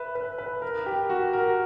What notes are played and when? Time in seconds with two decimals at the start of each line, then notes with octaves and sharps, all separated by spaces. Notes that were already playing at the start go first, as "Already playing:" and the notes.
Already playing: B4 E5
0.15 B4
0.38 B4
0.62 A#4
0.86 G4
1.10 F#4
1.33 A#4